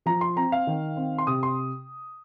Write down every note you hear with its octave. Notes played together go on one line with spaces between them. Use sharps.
F3 A#5
C6
C4 A#5
F5
D#3
C4
C6
C3 D#6
C6